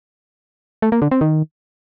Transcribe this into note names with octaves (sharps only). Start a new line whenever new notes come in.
A3
A#3
D3
C4
D#3